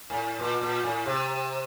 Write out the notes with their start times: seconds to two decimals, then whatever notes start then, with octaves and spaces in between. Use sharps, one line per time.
0.10 A2
0.39 A#2
0.62 A#2
0.84 A2
1.06 C3